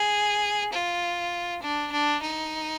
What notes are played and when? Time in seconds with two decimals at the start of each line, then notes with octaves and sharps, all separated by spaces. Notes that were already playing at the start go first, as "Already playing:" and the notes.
Already playing: G#4
0.72 F4
1.62 D4
1.91 D4
2.22 D#4